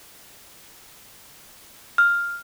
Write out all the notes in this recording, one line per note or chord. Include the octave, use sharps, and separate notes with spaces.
F6